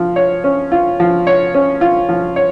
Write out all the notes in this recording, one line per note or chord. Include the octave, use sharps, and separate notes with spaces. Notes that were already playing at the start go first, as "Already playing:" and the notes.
Already playing: F3
C#5
C#4
F4
F3
C#5
C#4
F4
F3
C#5